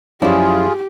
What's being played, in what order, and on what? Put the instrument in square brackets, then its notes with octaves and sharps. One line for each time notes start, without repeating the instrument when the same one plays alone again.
[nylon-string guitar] F#2 E4 [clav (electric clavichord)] F3 C#4 D5 [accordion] F4 G#4 [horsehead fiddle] G4